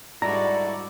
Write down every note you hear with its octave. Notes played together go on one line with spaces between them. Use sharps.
G#2 G3 D4 E4 F#4 A4 D5 A#5